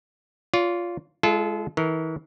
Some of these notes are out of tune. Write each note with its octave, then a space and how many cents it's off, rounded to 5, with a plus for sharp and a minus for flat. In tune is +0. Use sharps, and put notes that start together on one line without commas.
F4 +0 D5 -45
G#3 +5 F4 -30 A4 -35
E3 -40 A#4 -30